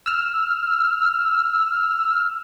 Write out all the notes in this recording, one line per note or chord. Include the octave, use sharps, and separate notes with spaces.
E6 F6